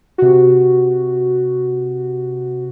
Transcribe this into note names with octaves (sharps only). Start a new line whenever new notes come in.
C3 F#4